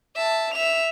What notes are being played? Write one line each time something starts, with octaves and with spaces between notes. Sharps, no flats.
E5 A5
E5 F7